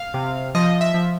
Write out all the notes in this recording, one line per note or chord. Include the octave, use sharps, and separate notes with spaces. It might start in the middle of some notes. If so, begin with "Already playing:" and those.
Already playing: F5
C3
F3 D#5
E5
F3